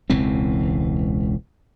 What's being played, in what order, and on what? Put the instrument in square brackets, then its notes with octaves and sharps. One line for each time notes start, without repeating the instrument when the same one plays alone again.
[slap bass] E1 C#2 E3 C4